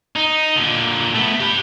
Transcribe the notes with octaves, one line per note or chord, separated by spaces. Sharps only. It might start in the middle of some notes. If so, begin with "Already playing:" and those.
D#4
A#2 D3
A3 B3
G4 B4